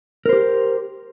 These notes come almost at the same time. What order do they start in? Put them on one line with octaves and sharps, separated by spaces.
A#4 C5 G4